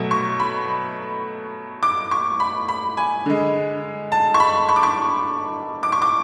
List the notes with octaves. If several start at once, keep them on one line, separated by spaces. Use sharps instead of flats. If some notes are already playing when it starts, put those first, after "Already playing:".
Already playing: B2 F#3 A3
C#6
B5
D6
C#6
B5
B5
G#5
D3 G#3
A5
C#6
B5
C#6
D6
C#6
D6
C#6
D6